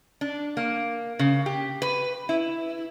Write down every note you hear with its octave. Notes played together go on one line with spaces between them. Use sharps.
D4
A#3
C#3
G4
B4
E4